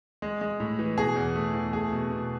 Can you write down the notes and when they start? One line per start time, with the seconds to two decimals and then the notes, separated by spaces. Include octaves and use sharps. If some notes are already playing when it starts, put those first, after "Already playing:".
0.22 G#3
0.41 G#3
0.60 A2
0.79 E3
0.97 B2 G#4
1.16 E2
1.36 A3
1.54 E2
1.73 A3 G#4
1.92 B2
2.10 B2